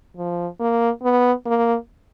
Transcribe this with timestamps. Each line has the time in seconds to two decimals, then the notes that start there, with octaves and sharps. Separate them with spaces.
0.17 F3
0.60 A#3
1.03 B3
1.46 A#3